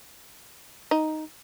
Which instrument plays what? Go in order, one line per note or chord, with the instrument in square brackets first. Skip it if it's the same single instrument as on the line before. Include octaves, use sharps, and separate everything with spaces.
[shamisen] D#4